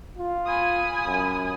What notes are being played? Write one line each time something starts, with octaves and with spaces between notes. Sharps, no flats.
F4
G#5 B5 D#6
F#2